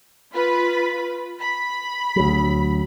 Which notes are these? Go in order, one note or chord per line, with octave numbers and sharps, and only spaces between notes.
F4 B4 B5
B5
D2 F#3